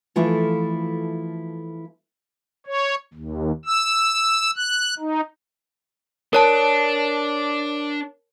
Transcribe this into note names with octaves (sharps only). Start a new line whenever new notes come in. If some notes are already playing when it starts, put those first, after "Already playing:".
E3 F3 A3 E4 F4 A4
C#5
D#2
E6
F#6
D#4
D4 A#4 C#5 A5